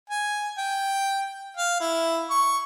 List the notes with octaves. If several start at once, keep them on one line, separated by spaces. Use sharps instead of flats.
G#5
G5
F5
E4
C#6